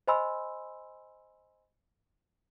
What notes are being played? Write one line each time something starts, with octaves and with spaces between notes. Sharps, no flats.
C5 D#5 G#5 B5 C6 E6